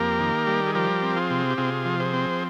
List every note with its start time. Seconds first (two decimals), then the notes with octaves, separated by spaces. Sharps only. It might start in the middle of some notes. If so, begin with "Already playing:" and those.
Already playing: F2 A#3 G4 A#4
0.19 D#3
0.47 G3
0.67 G#4
0.75 F3 G4 A#4
1.02 C4
1.16 F4 G#4
1.30 C3
1.51 G4
1.57 C3 F4 G#4
1.85 F3
2.00 G#4 C5
2.13 C4